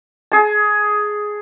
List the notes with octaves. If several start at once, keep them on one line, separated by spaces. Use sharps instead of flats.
G#4 A5